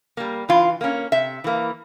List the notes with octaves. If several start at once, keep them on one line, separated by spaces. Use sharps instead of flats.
G3 A#3
E3 F4
A#3 C#4
C3 E5
E3 A#3